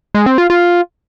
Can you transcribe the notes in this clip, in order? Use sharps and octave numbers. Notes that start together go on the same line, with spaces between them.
G#3
C4
F4
F4